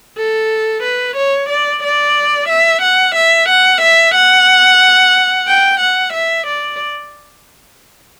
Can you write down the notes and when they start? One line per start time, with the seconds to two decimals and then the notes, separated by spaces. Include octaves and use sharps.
0.17 A4
0.83 B4
1.16 C#5
1.50 D5
1.83 D5
2.49 E5
2.82 F#5
3.16 E5
3.49 F#5
3.82 E5
4.15 F#5
5.47 G5
5.80 F#5
6.14 E5
6.47 D5